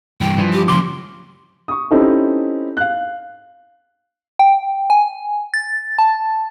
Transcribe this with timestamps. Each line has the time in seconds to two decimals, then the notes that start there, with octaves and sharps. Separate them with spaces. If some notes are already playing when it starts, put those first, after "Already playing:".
0.21 G2 E3 G5
0.38 G2 E3 F3
0.53 G4
0.68 C#2 C#3 F3 F#3 C6 D6
1.68 C#6 D#6
1.91 C4 C#4 D#4 E4 G4 A4
2.77 F5 F#6
4.39 G5
4.90 G#5
5.54 A6
5.98 A5